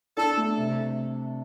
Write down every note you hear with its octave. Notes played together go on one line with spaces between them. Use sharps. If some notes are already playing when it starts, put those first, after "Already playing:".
D4 A4
A3
C3